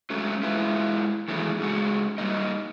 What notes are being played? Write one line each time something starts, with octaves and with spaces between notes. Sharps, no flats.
F#3 G#3 A3 C#4
G#3 E4 F4 B4 E5
D#3 E3 F#3 G#3 A3 B3
G#2 C#3 G#3 F#4
F#3 G3 A#3 D#4 D#5